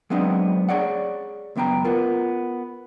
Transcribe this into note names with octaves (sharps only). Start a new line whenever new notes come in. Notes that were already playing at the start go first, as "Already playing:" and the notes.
F#3 G#3 B3 C4 D4 D#4
G#4 C#5 D5 F#5
C#2 F#2 B3 G5 A#5
B3 F4 A#4